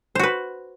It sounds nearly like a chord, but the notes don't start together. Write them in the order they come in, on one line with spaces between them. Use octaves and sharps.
C5 F#4 B4